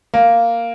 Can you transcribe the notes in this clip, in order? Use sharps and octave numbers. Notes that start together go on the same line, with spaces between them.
A#3